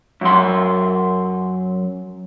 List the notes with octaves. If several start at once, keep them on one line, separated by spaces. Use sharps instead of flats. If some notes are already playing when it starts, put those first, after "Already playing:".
F#2 C6